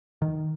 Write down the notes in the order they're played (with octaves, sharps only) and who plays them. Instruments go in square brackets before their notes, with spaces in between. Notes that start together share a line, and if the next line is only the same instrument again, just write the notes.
[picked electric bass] D#3